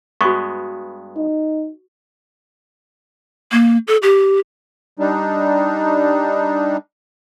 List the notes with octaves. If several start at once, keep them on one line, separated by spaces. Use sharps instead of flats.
G2 G#3 B3 F#4 C#6
D#4
A#3
A4
G4
G3 D4 D#4